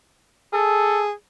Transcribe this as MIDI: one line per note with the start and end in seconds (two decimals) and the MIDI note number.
0.53 1.12 68
0.53 1.04 69